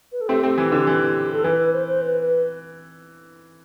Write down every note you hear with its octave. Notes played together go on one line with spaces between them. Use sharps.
B4
A4
A3 C4 G4
A3 C4
E3
D3
E3
A4
E3 B4
B4
C5
C5
B4
B4